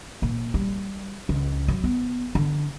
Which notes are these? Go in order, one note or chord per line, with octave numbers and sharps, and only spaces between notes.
A#2
G3
C#2
F#3
B3
D3